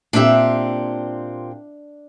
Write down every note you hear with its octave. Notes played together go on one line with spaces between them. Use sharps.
A#2 C4 D4 G4 E5